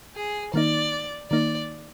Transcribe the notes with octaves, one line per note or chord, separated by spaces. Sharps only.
G#4
D#3 A#3 D#4 D5
D#3 A#3 D#4 D5